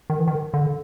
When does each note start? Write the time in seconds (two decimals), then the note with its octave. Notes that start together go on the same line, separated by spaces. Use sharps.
0.10 D#3
0.19 E3
0.28 D#3
0.54 D3